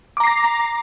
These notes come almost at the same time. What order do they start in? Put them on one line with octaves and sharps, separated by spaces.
D6 A#5 C7 A#6